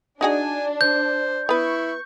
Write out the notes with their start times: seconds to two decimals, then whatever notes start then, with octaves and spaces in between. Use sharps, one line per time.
0.21 D4 D#4 F#4 G#4 G#5
0.81 C5 G6
1.49 B3 E4 B4 C#6